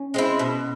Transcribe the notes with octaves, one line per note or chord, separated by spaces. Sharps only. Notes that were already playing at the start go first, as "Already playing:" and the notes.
Already playing: C#4
G#3 C4 E4
B2